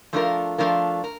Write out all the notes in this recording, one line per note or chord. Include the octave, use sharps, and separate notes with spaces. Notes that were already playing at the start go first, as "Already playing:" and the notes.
F3 A3 D4 F4 A#4
F3 A3 D4 F4 A#4
A#4